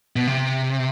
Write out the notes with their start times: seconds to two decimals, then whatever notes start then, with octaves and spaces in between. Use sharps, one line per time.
0.16 B2
0.27 C3